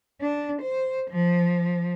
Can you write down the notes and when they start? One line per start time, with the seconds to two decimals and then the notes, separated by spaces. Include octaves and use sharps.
0.21 D4
0.61 C5
1.11 F3